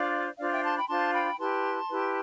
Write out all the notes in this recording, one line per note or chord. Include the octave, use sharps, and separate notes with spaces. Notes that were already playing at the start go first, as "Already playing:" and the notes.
Already playing: D4 F4 C5 D5 F5
D4 F4 C5 D5 F5
E5 G5
A5 C6
G5 B5
D4 F4 C5 A5 C6
G5 B5
E4 G4 B4 A5 C6
E4 G4 B4